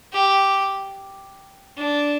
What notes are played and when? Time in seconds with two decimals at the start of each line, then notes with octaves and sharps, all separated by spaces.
0.13 G4
1.77 D4